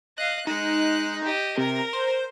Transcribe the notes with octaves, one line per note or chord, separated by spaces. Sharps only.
D#5 F5 F#6
G#3 D#4 F#6
G4 D#5
C3 A#4 A#5
C5